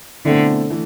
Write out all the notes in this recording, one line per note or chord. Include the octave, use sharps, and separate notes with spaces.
B2 D3 A3 C4 E4
E3 A3